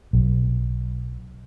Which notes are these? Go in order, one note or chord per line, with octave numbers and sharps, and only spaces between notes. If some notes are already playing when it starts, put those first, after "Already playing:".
B1